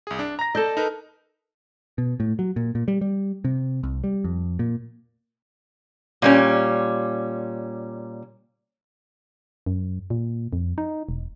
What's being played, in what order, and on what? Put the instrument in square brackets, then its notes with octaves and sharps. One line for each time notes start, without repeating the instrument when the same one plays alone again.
[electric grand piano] C2 G#4
D4
A#5 A#6
[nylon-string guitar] A4 D#5 [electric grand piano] D5 G6
[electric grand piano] D#4 A#4 B4
[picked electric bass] B2
A2
F#3
A#2
A#2
G3
G3
C3
C2
G3
F2
A#2
[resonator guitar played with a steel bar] A#2 G3 C#4
[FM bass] F#2
A#2
F2
D#4
E1